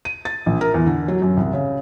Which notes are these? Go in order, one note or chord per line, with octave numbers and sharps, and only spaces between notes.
D#7
A6
A#1
A#4
E2
D3
F#3
F#2
C2
C#3